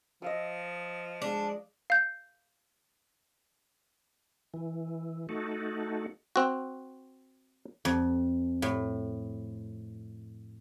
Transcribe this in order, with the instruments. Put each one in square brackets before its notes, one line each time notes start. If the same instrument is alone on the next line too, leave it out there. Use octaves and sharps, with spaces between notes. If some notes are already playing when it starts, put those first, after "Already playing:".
[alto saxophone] F3 [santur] D#5 F5 E6
[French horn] G#3 [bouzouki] D4
[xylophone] F5 G6
[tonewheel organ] E3
A3 D#4 F#4 A4
[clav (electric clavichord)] C4 F#4
[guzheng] F2
A2